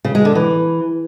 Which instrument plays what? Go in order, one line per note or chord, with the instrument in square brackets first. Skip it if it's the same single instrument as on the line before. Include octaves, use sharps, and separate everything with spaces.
[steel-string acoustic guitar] C#3
G#3
D3
E3